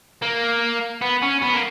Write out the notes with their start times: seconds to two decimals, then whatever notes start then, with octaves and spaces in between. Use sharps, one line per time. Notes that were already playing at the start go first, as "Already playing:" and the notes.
0.22 A#3
1.01 B3
1.22 C#4
1.42 B3
1.54 A#3